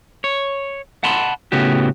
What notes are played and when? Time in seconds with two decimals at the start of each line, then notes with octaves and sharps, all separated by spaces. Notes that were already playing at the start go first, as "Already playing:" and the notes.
0.24 C#5
1.03 F#5 A5 B5 C6
1.52 A2 C#3 B3 F#4 G4